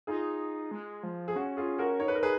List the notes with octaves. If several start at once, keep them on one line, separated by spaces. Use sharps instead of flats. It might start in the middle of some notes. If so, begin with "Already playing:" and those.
D#4 F4 G#4
G#3
F3
G#4
C#4 F#4
F4 G#4
F#4 A#4
D#4 C#5
B4
A#4
G#4 B4